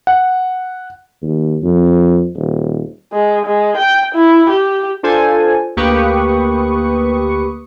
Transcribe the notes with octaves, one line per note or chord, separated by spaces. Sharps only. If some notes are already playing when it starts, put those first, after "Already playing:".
F#5
D#2
F2
D#1
G#3
G#3
G5
E4
G4
D4 F4 A4 C5 G#5
D2 A#3 G4 B4 C#6 D#6